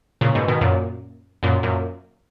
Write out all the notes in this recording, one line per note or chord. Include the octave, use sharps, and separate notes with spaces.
A#2 C#3
G#2 B2
B2 D#3
F#2 A#2
F#2 A#2
F#2 A#2